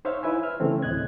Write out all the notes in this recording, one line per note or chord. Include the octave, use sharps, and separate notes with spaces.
D#4 C5 C#5 E5 F5
E4 B4 E5 G#5
E5 F6
C#3 E3 A3 C4
D2 A2 D#5 F#6 G#6